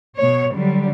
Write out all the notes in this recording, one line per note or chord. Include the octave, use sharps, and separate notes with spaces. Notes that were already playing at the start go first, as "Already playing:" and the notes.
B2 C#5
D3 F#3 G3